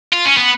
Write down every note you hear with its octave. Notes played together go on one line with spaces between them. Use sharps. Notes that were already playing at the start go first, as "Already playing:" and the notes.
F4
C#4
B3